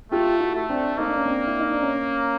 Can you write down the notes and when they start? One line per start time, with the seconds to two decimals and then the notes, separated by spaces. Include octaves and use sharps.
0.11 A3 F4 G4
0.40 E4 F#4
0.55 A3
0.69 C4 D4
0.98 A#3 D#4
1.06 D4
1.16 C#4
1.25 C4 D4
1.47 E4
1.59 D#4
1.70 D4
1.82 C#4